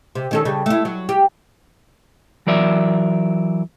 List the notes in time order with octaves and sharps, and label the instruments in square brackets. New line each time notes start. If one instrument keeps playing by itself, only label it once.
[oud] C3
D#3 C#4 A4
C#3 G3
A3 E4
F#3
G4
[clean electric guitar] E3 F#3 A#4 D5 E5